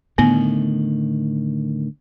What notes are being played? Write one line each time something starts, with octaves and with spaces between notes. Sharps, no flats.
A2 D3 D#3 B3